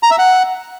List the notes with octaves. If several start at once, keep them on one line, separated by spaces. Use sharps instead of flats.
A#5
E5
F#5